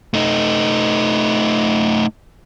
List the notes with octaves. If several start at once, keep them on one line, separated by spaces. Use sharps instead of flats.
A3 D#4